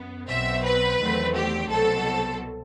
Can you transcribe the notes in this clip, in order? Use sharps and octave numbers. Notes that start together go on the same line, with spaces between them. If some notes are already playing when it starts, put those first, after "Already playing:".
Already playing: F#2 B3
B1 B2 F#3 C4 E5
B4
E2 D#3 F#3 A3 C4
G4
C2 B2 F#3 C4 A4